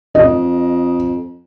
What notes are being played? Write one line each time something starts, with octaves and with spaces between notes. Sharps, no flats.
F2 D#5